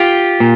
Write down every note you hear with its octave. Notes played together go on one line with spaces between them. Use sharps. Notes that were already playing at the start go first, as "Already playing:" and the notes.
Already playing: F4 G4
A#2